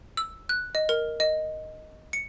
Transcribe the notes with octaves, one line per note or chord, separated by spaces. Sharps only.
E6
F#6
D#5
A#4
D#5
C#7